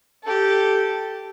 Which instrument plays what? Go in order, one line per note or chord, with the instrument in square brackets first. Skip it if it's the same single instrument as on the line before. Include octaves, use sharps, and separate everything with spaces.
[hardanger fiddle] G4 A4